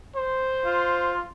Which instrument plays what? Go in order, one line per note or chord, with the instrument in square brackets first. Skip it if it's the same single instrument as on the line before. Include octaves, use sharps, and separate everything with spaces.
[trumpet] C5
[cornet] F4